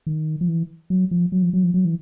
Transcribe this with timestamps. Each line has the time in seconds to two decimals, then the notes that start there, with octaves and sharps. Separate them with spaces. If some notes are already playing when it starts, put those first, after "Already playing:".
0.07 D#3
0.41 F3
0.48 E3
0.90 F#3
1.11 F3
1.32 F#3
1.42 F3
1.53 F#3
1.63 F3
1.74 F#3
1.85 E3